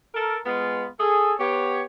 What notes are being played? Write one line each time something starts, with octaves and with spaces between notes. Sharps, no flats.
A4 A#4
G#3 B3 F4
G#4 A4
B3 G4 C#5